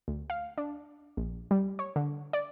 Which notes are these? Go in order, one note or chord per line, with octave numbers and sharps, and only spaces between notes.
D2
F5
D4
A#1
G3
C#5
D3
D5